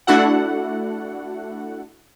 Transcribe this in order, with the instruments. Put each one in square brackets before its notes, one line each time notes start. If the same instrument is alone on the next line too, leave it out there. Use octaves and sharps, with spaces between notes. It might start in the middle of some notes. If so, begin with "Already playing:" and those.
[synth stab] A3 D4 E4 F#4 A4 F#5